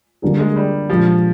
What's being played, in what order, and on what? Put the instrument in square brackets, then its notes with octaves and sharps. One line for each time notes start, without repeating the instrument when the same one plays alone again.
[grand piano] D3 G3 A#3 D4 G#4
[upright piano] G#3
G3
[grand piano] A#2 G#3 D4 G4 [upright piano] F3